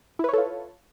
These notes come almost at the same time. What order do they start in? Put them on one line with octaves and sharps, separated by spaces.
E4 B4 C#5 A4 F4